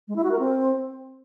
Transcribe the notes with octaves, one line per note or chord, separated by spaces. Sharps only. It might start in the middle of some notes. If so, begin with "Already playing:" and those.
G#3
E4
F#4
A#4
C4